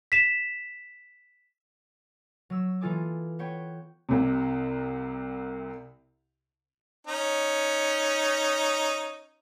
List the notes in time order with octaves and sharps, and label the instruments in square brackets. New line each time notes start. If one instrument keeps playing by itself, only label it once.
[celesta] B6 E7
[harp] F#3 E6
E3 A#3 F4 A4 G#5 D6
B3 C#5 G5
[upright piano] C2 C3
[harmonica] C#4 D#4